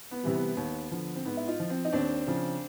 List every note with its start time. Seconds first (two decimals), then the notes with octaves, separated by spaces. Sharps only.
0.11 B3
0.23 C3 E3 G3
0.34 B3
0.57 D#2
0.91 D3 F3
1.16 C4
1.25 G#2 B3
1.37 E4
1.48 D#4 F4
1.60 F3
1.70 C4
1.85 D#4
1.92 D#2 C4 D4
2.27 C#3 F3